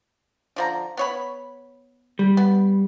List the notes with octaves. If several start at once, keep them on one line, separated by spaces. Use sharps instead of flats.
D3 F3 A#5
B3 C#5 B5
G3
B3